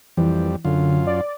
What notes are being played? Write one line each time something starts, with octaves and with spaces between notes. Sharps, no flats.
F2 E3 G3
F#2 D3 F4
D5